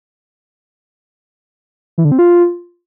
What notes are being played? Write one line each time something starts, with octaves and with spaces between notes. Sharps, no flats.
E3
D3
C4
F4